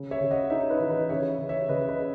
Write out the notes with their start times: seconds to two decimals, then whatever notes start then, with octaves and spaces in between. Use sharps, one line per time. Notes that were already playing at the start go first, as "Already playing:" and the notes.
Already playing: C#3
0.11 C#5 E5
0.21 C#3
0.31 D#5 F#5
0.50 D#4 C#5 E5
0.70 B4 D#5
0.80 E3
0.90 B4 D#5
1.09 C#3 C#5 E5
1.39 C#3
1.49 C#5 E5
1.69 C#3 B4 D#5
1.89 B4 D#5
1.98 C#4